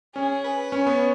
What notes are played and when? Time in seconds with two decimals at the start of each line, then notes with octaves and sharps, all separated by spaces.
0.15 C#4 G#4
0.44 B4
0.72 C#4 C#5
0.87 B3